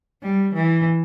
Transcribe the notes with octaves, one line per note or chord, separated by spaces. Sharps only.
G3
E3